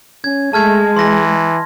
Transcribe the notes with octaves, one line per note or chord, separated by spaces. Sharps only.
C#4 G#6
G#3 A3 G#4 A5 F6 G#6
E3 C6 A#6